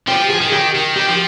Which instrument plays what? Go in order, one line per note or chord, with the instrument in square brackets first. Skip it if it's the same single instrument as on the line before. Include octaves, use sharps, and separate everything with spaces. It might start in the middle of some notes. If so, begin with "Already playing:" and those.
[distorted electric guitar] F3 [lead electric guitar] G4
[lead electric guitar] G#4
[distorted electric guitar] D#3
[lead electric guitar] G4
[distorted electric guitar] D#3
[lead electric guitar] G4
[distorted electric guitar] F3